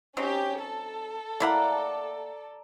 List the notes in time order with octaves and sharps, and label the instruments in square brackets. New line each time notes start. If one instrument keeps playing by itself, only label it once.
[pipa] F#3 C4 D#4 [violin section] C#4 G4
[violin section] A4
[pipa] A#3 E4 F#5 [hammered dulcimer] D5 A#5